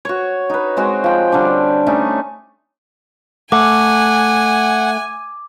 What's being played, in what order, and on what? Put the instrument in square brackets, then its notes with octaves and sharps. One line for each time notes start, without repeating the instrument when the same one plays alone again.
[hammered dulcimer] F#4 C#5
D#4 B4
G#3 C4 F#4
F3 G5
D3 G3 D4
A3 C#4 D#4
[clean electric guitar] A3 [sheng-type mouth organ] F#5 [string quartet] G#5 [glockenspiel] D6